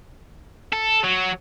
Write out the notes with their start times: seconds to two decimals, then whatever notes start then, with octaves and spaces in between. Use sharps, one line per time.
0.72 A4
1.03 F#3